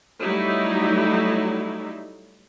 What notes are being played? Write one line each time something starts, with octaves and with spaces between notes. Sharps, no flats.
F#3 G3 A3 D#4 E4